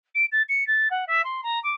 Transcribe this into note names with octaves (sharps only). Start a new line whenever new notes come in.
D7
A6
C#7
A6
F#5
E5
C6
A#5
D6